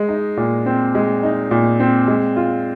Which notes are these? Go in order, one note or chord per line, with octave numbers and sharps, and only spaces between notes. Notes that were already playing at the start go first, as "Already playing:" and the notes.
Already playing: G#3
D#4
A#2
C4
G#3
D#4
A#2
C4
G#3
F4